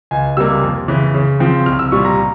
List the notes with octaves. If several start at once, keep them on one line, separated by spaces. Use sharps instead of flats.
C#2 G#5
C3 G3 A#3 E6
F2
C#3 E3
C#3
F3 C4
C2 F6
E6
A#2 G3 C#6
A#5